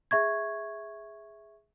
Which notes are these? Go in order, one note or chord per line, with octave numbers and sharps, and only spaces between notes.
G#4 E5 C#6 G#6